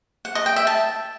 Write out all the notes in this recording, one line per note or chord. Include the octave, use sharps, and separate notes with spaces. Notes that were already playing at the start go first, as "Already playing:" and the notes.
F#5
D#5
G5
E5
A5